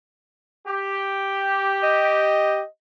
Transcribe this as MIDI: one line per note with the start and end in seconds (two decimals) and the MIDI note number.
0.65 2.58 67
1.83 2.66 75